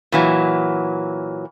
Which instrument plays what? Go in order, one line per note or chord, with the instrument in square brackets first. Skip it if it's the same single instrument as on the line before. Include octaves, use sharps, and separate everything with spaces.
[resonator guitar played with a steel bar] A#2 E3 F#3